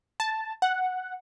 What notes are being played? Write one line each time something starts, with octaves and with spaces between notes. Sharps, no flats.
A5
F#5